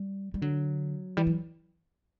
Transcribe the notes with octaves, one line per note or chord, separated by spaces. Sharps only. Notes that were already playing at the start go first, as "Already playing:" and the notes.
Already playing: G3
G3
D3 F#3
E3 G3
F#3